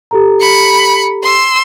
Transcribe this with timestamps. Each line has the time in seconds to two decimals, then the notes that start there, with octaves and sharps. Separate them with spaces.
0.11 G4 A4 A#5
0.41 B5 C#7
1.23 C6 E6